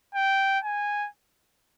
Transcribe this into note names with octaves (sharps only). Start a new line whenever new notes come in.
G5
G#5